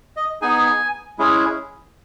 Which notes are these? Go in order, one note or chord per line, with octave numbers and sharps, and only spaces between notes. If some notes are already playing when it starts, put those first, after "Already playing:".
D#5
B3 D#4 G#4 G#5
G#3 C#4 E4 G#4